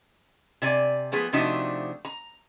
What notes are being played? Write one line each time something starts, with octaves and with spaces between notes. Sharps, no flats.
C3 D5 G#5
F3 A3 B3 G#4
C3 F3 A3 D4 D#4 F#4
A#5